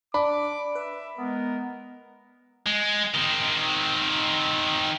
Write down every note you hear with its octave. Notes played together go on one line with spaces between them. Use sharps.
D4 B5 D6
B4 E5
G#3 B3 A#4
G#3
D#3 C4